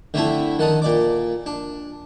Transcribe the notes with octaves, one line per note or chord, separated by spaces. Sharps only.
D3 A3 C4 E4 A4
D#3 F#5 A5 D#6
A#2 D5 D6
D4